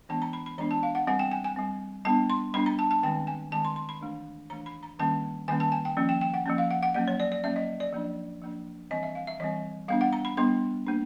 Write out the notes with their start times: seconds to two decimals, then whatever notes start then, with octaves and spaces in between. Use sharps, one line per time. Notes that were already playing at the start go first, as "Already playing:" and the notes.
0.09 E3 G#3 B3 D4 A5
0.22 A#5
0.33 B5
0.46 B5
0.58 E3 G#3 B3 D4 A#5
0.71 A5
0.83 F5
0.95 F#5
1.07 G3 C4 F#5
1.19 G5
1.32 G#5
1.44 G#5
1.56 G3 C4
2.05 G3 B3 D4 A5
2.30 C6
2.54 G3 B3 D4 B5
2.66 A#5
2.79 A5
2.91 A5
3.03 D#3 G#3 C4 G5
3.27 G#5
3.52 D#3 G#3 C4 A5
3.65 C6
3.76 C6
3.89 B5
4.01 E3 A3 D4
4.50 E3 A3 D4 A#5
4.66 B5
4.83 A#5
4.99 D#3 G3 A#3 C#4 A5
5.48 D#3 G3 A#3 C#4 G#5
5.60 A5
5.72 G#5
5.85 G5
5.97 F3 A#3 C#4
6.09 G5
6.21 G5
6.34 F#5
6.46 F3 A#3 C#4
6.58 F5
6.71 F#5
6.83 F#5
6.94 F#3 A#3 C#4 F#5
7.08 C#5
7.20 D5
7.32 D5
7.44 F#3 A#3 C#4 E5
7.56 D#5
7.80 D5
7.93 F3 A#3 D4
8.41 F3 A#3 D4
8.91 E3 G3 C4 D#5
9.03 E5
9.15 F5
9.27 E5
9.40 E3 G3 C4 D#5
9.88 G3 B3 D4 F5
10.01 F#5
10.13 A#5
10.25 B5
10.37 G3 B3 D4 C6
10.87 A#3 D4